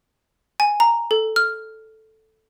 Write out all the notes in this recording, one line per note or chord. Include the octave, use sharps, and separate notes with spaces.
G#5
A#5
A4
F6